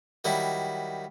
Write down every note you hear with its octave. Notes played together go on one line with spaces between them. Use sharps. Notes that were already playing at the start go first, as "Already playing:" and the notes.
D#3 F#3 G3 E4